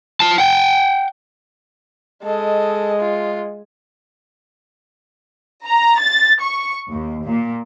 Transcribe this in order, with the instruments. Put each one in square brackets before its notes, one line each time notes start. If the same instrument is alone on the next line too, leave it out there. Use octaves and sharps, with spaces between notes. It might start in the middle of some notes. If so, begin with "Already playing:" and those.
[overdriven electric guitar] F4 A5
F#5 G5
[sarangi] G#3 [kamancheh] A4 D#5
[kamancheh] F4
[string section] A#5
A6
C#6
D#2
A#2